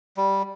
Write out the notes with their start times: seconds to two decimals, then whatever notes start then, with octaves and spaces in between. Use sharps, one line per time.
0.17 G3